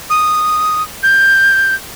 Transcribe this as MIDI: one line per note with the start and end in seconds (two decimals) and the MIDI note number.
0.10 0.83 87
1.03 1.75 91